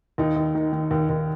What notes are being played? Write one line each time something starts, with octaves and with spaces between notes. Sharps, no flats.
D#2 D#4
D#2
D#3
D#3
D#2
D#2